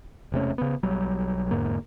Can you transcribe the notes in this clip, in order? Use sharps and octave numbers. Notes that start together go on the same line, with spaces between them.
E1 C3 A3 C#4
C#3 B3
B1 F#3 G3
E2 G#2 D3 A#3